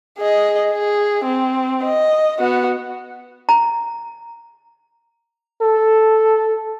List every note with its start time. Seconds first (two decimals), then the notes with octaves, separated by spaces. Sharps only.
0.19 G#4 D#5
0.71 G#4
1.25 C4
1.84 D#5
2.40 B3 F#4
3.49 A#5
5.62 A4